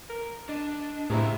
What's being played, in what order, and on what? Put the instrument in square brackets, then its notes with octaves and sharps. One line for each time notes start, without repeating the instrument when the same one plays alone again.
[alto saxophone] A#4
[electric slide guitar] D4 [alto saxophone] D#5
[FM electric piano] A2 [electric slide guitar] C#3 F4 A#5 [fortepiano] G#3 C4 E4